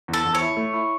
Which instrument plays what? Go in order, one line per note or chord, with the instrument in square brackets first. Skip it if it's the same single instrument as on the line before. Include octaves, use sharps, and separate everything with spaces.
[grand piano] E2
[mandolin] A4
[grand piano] E2
[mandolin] C#5
[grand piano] E4
A3
E4